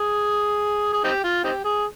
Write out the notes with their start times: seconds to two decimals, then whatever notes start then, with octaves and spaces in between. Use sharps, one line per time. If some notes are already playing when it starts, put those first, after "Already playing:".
Already playing: G#4
0.93 G#4
1.04 C4 D#4 G4
1.24 F4
1.44 C4 D#4 G4
1.64 G#4